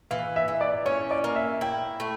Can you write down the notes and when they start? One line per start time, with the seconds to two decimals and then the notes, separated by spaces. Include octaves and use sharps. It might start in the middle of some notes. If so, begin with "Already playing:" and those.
0.11 E3 F5
0.36 E5
0.48 E3
0.61 D5
0.86 C#4 C#5
1.11 D5
1.24 A#3
1.36 E5
1.61 E4 G5
2.00 A3